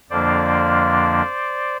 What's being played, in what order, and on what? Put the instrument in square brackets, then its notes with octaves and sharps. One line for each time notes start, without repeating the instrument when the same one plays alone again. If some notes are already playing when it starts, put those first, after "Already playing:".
[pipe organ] F2 D3 F3 A#3 D4 C5 D5